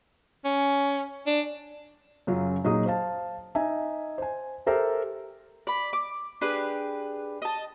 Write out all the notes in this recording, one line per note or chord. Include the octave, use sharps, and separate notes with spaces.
C#4
D4
F#2 C#3 F#3 F4
A#2 F#3 D#4 G#4 D#6
C5 F5 A5
D#4 E5 G#5
C5 G#5
G4 A4 A#4 C5 E5
D5 B5
D6
D4 G4 G#4 B4
D#5 A5